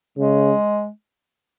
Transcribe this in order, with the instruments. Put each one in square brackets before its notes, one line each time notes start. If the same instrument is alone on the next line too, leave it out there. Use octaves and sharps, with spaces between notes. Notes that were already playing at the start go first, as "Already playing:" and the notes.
[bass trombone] C#3 [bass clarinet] G#3